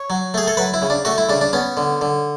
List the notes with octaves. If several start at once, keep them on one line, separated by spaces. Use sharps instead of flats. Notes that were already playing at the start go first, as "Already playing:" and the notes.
Already playing: C#5
F#3
A3 G#4
A4
F#3 B4
E4
C#3
D4
A3 F#4
E4
C#3 D4
D4
B3 C#4
D3
D3